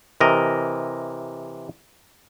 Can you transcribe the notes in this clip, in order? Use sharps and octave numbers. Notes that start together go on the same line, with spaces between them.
C3 E3 A#4 D#5